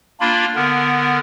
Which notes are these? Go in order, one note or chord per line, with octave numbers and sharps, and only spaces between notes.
A#3 D4 F4 B5
D3 B3 A#4